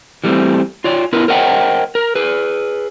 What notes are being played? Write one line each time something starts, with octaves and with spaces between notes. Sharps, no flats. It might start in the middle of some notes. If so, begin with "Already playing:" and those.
E3 G3 A3 B3 C4
F4 C#5 D5
B3 E4 A#4 B4
A#4 C5 C#5 D#5 F#5 G5
A#4
G#4 B4